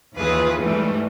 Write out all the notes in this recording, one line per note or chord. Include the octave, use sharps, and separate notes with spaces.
D#2 E3 F4 G#4 B4
G#2 E3 G3 A3